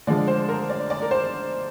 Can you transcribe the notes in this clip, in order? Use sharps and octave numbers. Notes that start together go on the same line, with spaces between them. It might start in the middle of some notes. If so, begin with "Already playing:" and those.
D3 F3 G#3 D5
C5
A#4
D5
D5
A#4
C5